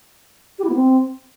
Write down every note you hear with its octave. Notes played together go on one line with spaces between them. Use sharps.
G4
E4
B3
C4